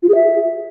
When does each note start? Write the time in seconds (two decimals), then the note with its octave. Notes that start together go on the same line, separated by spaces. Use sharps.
0.03 F4
0.09 G#4
0.15 E5